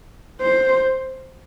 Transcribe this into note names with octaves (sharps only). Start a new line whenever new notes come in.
C5